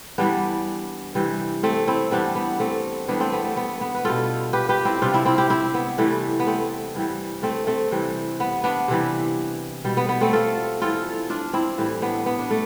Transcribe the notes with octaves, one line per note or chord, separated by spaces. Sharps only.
G2 E3 G3 B3 D4
C3 E3 G3
A3 C4
C4 E4
G2 E3 G3 B3 D4
B3
A3 C4
G2 E3 G3 B3 D4
A3 C4
B3
A3
B3
B3
B4
B2 G3 F4 A4
G4 B4
G4 B4
C4 E4
C3 G3 D4 F4
C4 E4
C4 E4
E4 G4
C4 E4
B3
C3 E3 G3 A3
B3
A3 C4
G2 E3 G3
A3 C4
A3 C4
C3 E3 G3
B3
B3 D4
C3 E3 G3
B2 G3
B3
B3
A3 C4
F4 A4
G2 E3 G3 F4 A4
D4 F4
C4 E4
A2 E3 G3
B3 D4
B3
D4
A3